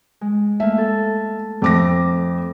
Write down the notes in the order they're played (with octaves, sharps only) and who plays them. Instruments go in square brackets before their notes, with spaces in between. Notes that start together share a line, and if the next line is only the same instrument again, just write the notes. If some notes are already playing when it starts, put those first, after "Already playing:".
[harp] G#3
[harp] A3 A#3 [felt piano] E5
[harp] A4
[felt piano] F2 D6 A#6 [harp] A3